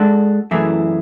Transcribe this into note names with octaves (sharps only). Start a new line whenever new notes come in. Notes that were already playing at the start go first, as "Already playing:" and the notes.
Already playing: G#3 D4 F#4 A4
F#2 E3 A3 E4 G#4